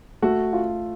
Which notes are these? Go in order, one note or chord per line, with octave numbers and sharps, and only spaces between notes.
A3 F#4
F4